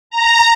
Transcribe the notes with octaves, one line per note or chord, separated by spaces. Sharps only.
A#5